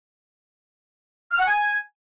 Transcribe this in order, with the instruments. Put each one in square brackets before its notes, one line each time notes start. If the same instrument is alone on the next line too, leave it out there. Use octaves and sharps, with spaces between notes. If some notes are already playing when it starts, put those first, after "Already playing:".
[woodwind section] F6
F#5
G#5